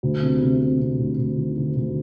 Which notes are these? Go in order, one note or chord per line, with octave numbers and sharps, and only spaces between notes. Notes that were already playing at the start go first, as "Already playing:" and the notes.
D2
C3
C3
C3
C3
D2
D2
D#3
D2
D2